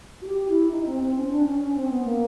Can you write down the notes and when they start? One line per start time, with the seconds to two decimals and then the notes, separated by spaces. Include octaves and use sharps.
0.21 F#4
0.26 G4
0.48 E4
0.71 D#4
0.85 C4
1.00 C4
1.15 C#4
1.30 D4
1.45 C#4
1.60 C#4
1.75 C4
1.89 B3
2.04 A#3